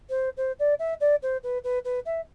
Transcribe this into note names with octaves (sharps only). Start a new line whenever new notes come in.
C5
C5
D5
E5
D5
C5
B4
B4
B4
E5